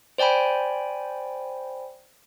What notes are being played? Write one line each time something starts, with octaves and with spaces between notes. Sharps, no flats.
C5 D5 G5 G#5 B5